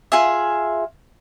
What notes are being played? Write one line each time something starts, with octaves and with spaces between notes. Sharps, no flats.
F4 G#4 E5